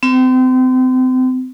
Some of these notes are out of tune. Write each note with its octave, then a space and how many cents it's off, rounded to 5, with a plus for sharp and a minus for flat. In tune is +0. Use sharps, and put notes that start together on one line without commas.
C4 -35